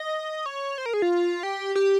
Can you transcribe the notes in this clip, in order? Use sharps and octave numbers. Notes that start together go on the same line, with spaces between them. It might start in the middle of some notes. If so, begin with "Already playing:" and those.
Already playing: D#5
C#5
C5
A#4
G#4
F4
G4
G4